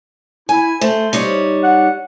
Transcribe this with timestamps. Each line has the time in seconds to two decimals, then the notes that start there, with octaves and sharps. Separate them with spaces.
0.49 E4 G#5
0.81 A3 C5
1.13 G3 D#4 C#5
1.63 F#5